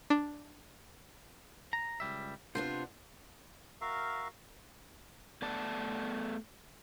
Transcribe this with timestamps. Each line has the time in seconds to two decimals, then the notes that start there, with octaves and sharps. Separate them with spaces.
0.10 D4
1.73 A#5
2.00 C#2 G3 E5
2.55 C3 B3 D4 F4 C5
3.81 F#4 A#4 E5 F5
5.42 A3 B3 D5 A5